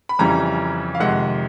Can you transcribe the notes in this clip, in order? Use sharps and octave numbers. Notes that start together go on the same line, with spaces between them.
B5
F2 C#3 E3 G3 A#5
F5
F2 C3 D#3 G#3 F#5